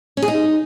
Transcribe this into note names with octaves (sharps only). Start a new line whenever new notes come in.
C#4
G#4
D#4